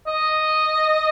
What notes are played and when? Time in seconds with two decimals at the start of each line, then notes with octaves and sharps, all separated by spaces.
0.07 D#5